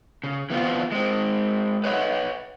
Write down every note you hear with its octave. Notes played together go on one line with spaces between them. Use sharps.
C#3
E3 B3 C4 F4
G#3 C4
B4 C#5 D#5 F#5